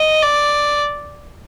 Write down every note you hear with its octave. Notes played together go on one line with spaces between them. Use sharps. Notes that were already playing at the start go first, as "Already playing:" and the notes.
Already playing: D#5
D5